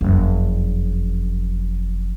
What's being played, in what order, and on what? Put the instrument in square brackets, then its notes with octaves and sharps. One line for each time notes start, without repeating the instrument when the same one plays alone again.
[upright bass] F#1 F2